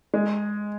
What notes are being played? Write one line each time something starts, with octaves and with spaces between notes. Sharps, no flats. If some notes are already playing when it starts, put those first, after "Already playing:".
G#3